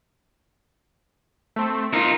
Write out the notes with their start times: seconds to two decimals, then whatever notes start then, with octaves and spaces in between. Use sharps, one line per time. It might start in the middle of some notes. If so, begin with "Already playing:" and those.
1.56 A3 C4
1.93 D#4 F4 A#4